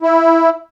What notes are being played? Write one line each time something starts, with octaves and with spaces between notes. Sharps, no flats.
E4